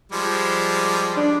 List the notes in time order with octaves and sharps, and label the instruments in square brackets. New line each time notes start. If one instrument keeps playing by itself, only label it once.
[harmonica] F3 G3 G#3
[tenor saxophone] D4